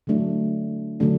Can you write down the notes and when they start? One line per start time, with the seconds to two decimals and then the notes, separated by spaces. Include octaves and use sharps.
0.07 D3 F#3 A3 D4
1.00 D3 F#3 A3 D4